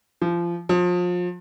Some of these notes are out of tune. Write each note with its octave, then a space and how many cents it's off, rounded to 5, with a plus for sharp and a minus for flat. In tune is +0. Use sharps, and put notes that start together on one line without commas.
F3 -25
F3 +30